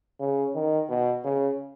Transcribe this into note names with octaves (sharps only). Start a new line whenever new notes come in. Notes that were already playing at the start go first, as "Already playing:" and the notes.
C#3
D#3
B2
C#3